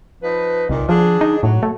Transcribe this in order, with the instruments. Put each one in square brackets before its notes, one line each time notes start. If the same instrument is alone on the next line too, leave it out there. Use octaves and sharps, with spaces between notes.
[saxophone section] F3 D#4 B4
[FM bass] C2 [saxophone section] A#2 D#3
[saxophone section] D3 D4 G#4 [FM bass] F3
[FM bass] D#4
[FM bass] A2 [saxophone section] F#3
[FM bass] A3